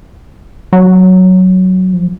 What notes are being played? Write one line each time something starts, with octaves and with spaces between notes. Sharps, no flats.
F#3
F3